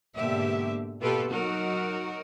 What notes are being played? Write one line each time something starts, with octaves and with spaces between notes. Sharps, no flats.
G#2 B2 D3 A#3 G4 E5
B2 A#3 F4 G4 A4 B4
F#3 D#4 F#4 A#4